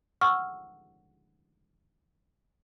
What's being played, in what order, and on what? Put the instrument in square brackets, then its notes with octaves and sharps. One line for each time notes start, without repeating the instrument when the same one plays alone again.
[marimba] F#5 C#6 E6 F6